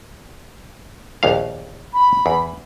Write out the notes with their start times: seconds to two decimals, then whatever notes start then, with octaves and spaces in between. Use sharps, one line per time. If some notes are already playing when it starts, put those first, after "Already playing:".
1.23 A#1 D#2 F5
1.93 B5
2.26 E2